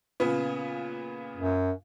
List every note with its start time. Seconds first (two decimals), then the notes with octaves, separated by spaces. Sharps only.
0.20 A#2 C#3 B3
1.36 F#2